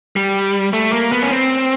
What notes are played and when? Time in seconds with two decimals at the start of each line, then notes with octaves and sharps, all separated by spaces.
0.16 G3
0.73 A3
0.93 A#3
1.12 B3
1.23 C#4
1.31 C4